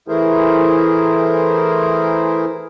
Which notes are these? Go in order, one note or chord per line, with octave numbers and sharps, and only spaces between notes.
E3 A3 E4 G#4 A#4 C5